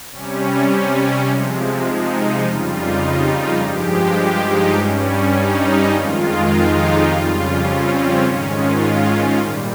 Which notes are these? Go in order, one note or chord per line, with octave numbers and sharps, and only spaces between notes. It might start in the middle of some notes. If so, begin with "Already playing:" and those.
C3 G3 C#4
C3 F3 G#3
D#4
F2 C#3 G3 F4
D#4
D#4
G2 F3 G#3 G4
G4
D#4
G2 G3 C#4
D#4
F2 D#3 G#3 F4
D#4
G4
F2 C#3 G3 F4
C#4
C4
G#2 D#3 G#3 C#4
F4
A#2 G3